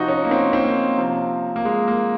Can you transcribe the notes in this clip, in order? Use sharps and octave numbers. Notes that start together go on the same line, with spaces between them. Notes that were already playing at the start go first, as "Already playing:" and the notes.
Already playing: C3 F3 D#4 F#4
C#4
A#3
C4
C4
A#3
C3 F3
A#3
G#3
A#3